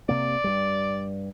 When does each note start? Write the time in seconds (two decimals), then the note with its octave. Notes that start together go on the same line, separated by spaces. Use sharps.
0.09 C3 A#3 D5
0.44 G2 G3